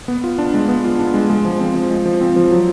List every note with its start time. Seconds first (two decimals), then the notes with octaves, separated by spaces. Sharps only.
0.08 B3
0.24 F4
0.38 D4
0.54 G#3
0.69 B3
0.85 F4
0.99 D4
1.14 G#3
1.30 G#3
1.45 F3
1.60 C4
1.75 F3
1.91 G#3
2.06 F3
2.21 C4
2.36 F3
2.51 F#3